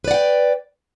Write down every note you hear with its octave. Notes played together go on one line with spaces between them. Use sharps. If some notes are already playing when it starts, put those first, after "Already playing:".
B4 D5 F#5 G5